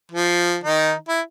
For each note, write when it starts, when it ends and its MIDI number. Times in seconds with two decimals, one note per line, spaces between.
0.12 0.56 53
0.64 0.93 51
0.64 0.93 63
1.08 1.21 64